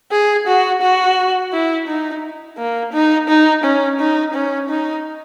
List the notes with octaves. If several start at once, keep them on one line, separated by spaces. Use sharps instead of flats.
G#4
F#4
F#4
E4
D#4
A#3
D#4
D#4
C#4
D#4
C#4
D#4